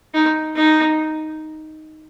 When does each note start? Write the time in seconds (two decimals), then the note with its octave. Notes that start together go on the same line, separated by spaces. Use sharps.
0.14 D#4
0.56 D#4